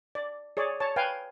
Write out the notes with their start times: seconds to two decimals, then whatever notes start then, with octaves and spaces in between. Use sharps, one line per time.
0.15 D5
0.57 G#4 C#5 D5
0.80 C#5 A5
0.96 B4 F5 G5 G#5